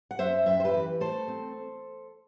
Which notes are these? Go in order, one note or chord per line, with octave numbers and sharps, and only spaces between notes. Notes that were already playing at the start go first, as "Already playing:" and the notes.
F#5
F#2 C5 E5
F#2 E5 G5
C5
G4 B4
E3
A3 A4 C5
C4